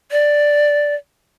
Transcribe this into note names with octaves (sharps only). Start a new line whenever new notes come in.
D5